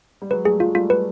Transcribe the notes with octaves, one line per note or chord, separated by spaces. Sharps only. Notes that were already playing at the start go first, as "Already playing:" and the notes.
G3
F#3 G#3 B4
G3 A3 G#4
F#3 G#3 F4
G3 A3 F4
B4